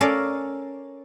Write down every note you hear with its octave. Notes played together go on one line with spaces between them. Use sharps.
C#4 A4 A#4 D5 F5